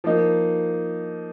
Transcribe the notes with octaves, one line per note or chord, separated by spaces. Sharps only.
F3 A#3 D#4